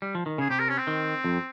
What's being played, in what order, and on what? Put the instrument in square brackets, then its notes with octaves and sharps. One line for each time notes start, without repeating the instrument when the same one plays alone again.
[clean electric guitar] G3
F3
D#3
[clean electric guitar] C#3 [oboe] G#4
[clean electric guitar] C3 [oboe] G4
[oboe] A#4
C#4
C4
[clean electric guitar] D#3
F2